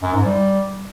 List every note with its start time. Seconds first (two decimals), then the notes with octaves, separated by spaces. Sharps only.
0.02 F#2
0.13 G#2
0.24 G3